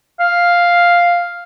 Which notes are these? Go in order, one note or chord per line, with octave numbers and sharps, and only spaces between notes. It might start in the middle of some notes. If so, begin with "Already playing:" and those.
F5